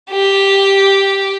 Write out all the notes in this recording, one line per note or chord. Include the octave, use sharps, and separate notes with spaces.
G4